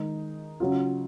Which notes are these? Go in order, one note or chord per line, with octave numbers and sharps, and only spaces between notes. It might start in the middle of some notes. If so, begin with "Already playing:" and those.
Already playing: D#3 G#3 D#4
C#3 F#3 C#4 F4